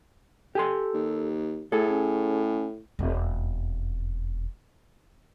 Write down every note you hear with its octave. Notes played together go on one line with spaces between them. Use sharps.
G4 A4 G#5 C6
D#2
A2 A3 G#4 A4
C#4
E1 F2